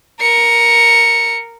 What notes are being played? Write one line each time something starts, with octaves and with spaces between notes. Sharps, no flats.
A#4 C#7